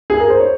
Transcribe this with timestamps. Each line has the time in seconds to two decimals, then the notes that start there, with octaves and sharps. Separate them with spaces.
0.10 G#4
0.20 A#4
0.30 C5
0.40 C#5